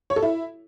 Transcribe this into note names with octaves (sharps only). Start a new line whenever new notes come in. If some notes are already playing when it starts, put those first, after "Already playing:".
C#5
A4
E4